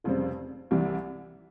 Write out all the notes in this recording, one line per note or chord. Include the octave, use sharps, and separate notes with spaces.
F1 F2 C#3 G3 C4
C2 C3 E3 G3